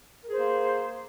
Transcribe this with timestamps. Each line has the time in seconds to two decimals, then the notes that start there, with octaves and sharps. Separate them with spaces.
0.23 A#4
0.28 G#4
0.33 C5
0.38 A#3